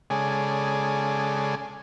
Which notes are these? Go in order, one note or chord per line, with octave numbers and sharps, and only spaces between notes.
C#3 G#3 G#4 A4 D5